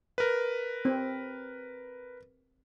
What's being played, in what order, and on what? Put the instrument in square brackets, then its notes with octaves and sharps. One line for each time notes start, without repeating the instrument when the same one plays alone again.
[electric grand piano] A#4 B4
[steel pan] C4